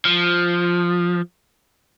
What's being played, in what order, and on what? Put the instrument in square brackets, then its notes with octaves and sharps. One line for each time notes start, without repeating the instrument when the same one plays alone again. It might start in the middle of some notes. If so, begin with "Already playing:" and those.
[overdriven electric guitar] F3